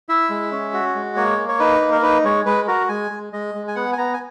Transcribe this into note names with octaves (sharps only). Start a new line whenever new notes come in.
E4 E5
G#3
C#4
F#4
G#3
A#3 C#5
A#3
C#5
D#4 B4
A#3
A#4
D#4 B4
G#3 C#5
G#3 B4
F#4 A#4
G#3 G#5
G#3
G#3 D#5
G#3
G#5
B3 F#5
G#5
B3 A#5
G#5